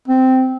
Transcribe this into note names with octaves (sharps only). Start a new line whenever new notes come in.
C4